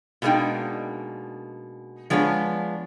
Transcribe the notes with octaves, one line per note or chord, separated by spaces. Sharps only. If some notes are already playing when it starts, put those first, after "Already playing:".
B2 G#3 A#3 D4 D#4 G5
F3 G#3 B3 D4 C#5